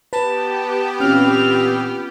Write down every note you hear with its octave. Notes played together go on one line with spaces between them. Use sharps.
B3 G4 B4 A5
A#2 E3 C4 C#4 F4 F6